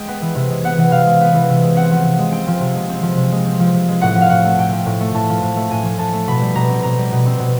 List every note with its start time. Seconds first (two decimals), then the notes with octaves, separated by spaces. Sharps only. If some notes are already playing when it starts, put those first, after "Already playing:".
Already playing: G#3 G5
0.08 B3
0.22 E3
0.35 C3
0.50 G#3
0.64 B3 F#5
0.78 E3
0.91 C3 F5
1.06 G#3
1.21 B3
1.35 E3
1.49 C3
1.63 G#3
1.76 C4 F#5
1.91 F3
2.04 C3
2.19 G#3
2.32 C4 G5
2.47 F3
2.61 C3
2.75 G#3
2.89 C4
3.03 F3
3.17 C3
3.32 G#3
3.46 C4
3.60 F3
3.74 C3
3.89 G#3
4.01 A2 F#5
4.15 F3
4.21 F5
4.30 A2 F#5
4.45 A3
4.58 A2 G5
4.73 F3
4.86 A2
5.00 A3
5.14 A2 A5
5.29 F3
5.42 A2
5.56 A3
5.71 A2 G#5
5.85 F3
5.99 A2 A5
6.13 A3
6.27 B2 B5
6.41 G3
6.55 B2 A#5
6.69 C4
6.83 B2 A#5
6.98 G3
7.12 B2
7.26 C4
7.40 B2